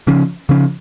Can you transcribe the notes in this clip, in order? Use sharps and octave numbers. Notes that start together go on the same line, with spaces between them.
C#3 F3 C#4
C#3 F3 C#4